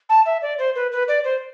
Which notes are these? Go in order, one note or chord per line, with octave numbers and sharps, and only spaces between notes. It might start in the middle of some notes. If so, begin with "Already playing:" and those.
A5
E5
D5
C5
B4
B4
D5
C5